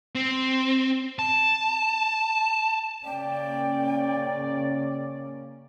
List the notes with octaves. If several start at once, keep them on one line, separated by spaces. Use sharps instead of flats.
C4
A5
C#3 A#3 C#4 D5 G5